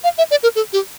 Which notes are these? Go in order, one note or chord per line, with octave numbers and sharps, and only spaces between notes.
F5
E5
D5
A#4
A4
G4